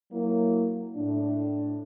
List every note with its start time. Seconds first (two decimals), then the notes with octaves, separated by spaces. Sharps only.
0.12 F#3 A#3 E4
0.96 A2 D4